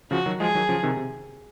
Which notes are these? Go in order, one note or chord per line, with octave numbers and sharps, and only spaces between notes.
C#3 F3 F#4
D#3 F#3
F3 G#3 G#4
D#3 F#3
C#3 F3
C3 D#3
C3